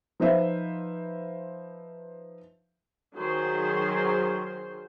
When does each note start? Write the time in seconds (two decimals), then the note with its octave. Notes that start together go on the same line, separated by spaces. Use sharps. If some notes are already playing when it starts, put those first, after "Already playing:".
0.20 F3 D#4 B4 C5 E5 F5
3.16 D#3 F#3 G#4 C5